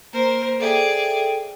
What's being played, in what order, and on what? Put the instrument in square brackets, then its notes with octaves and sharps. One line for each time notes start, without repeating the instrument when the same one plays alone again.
[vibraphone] A#3 [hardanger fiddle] A#4 C5
[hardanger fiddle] G#4 D5 [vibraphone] A4 E5 G5